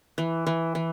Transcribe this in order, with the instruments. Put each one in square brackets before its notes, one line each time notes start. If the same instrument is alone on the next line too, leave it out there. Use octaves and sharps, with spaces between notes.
[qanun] E3
E3
E3